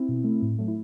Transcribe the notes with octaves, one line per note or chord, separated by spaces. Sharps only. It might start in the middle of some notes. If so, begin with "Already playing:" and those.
Already playing: C4 E4
B2
A3
A2
F#3 A3
E4